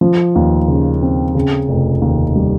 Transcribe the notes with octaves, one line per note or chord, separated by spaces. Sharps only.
F3
D#2
C#3
C4
C#3
F1
D#2
G3